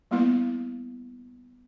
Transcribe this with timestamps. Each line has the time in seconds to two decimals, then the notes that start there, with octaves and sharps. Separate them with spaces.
0.11 G3 A#3 B3 E4 F5